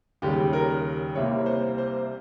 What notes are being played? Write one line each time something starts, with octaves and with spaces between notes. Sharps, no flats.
D#2 C#3 G3 G4
A#4
C2 C3 G3 A#3 C#5
C5
C5